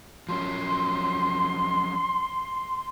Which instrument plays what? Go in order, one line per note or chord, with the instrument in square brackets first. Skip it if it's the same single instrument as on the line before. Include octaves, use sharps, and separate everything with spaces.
[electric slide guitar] F3 F#3 C#4 [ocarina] C6